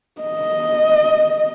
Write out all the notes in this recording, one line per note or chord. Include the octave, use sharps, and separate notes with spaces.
D#5